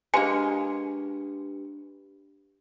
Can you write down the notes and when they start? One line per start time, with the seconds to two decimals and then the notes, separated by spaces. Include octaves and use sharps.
0.14 G#3 A#3 D4 G4 B4 G#5